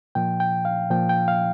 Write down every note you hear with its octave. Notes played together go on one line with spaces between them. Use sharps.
A#2 F3 G5
G5
F5
A#2 F3 G5
G5
F5